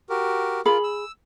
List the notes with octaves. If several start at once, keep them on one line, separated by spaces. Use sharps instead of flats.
F#4 G4 A#4
F4 G#4 A#4 B5
E6